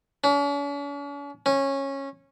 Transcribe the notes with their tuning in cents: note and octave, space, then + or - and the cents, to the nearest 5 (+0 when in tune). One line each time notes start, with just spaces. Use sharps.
C#4 +45
C#4 -15